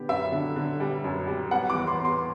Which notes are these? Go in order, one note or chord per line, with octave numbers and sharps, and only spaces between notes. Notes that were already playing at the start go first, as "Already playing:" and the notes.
Already playing: D3 B3 G4
F#2 E5
D3
D3
G3
F#2
G3
G3 F#5
D6
E2
C6
B3
C6